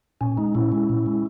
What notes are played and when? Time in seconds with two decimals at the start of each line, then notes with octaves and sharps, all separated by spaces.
0.21 A#2 C#4
0.37 G#3 D#4
0.54 A#2 C#4 E4
0.72 G#3
0.89 A#2
1.06 G#3